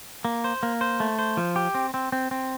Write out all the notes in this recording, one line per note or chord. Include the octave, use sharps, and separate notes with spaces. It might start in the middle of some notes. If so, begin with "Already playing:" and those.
A#3
C5
A#3
C5
A3
C5
F3
G4
C4
C4
C4
C4